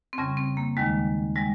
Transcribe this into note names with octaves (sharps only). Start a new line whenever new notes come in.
C4
F2 C#3 G3 C#4
C4
A#3
D#2 D#3 G3 G#3
G3 G#3